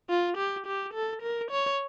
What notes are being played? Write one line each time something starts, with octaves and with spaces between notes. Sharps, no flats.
F4
G4
G4
A4
A#4
C#5